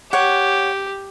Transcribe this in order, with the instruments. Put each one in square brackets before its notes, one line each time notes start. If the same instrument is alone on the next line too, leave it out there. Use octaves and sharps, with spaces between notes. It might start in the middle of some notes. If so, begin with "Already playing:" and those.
[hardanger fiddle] G4 [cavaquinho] C#5 F#5